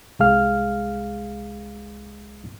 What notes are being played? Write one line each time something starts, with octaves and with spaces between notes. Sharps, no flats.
C2 G#3 G#4 F5 F6